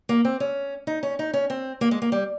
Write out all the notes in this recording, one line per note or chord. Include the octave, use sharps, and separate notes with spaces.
A#3
C4
C#4
D#4
C#4
D#4
C#4
C4
A#3
G#3
A#3
G3